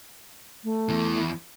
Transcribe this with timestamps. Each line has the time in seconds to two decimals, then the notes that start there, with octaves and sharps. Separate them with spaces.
0.64 A3
0.89 E2 E3